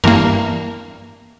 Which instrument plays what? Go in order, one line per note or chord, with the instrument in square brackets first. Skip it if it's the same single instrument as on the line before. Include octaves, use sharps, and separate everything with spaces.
[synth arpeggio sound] G2 E3 A#3 A#4